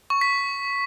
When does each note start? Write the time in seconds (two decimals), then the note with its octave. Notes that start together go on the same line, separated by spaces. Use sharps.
0.10 C#6
0.21 B6